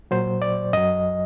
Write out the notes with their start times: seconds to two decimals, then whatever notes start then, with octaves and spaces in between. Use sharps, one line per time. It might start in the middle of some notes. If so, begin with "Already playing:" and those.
0.11 A#2 F#3 C5
0.42 D5
0.73 F#2 F#3 D#5